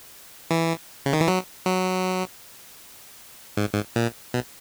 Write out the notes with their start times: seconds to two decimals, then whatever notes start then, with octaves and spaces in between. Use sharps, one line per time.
0.51 E3
1.06 C#3
1.13 D#3
1.21 E3
1.28 F#3
1.66 F#3
3.57 G#2
3.74 G#2
3.96 A#2
4.34 B2